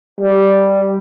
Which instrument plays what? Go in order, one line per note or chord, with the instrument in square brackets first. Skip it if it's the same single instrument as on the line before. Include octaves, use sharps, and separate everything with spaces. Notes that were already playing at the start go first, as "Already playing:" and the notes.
[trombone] G3